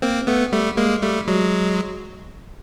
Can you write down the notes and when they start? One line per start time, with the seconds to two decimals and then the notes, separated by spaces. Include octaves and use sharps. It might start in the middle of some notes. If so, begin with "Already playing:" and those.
0.02 A#3 C4
0.27 A3 B3
0.52 G3 A3
0.77 G#3 A#3
1.02 G3 A3
1.27 F#3 G#3